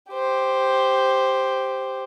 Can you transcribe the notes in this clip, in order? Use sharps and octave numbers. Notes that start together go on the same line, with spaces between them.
G4 C5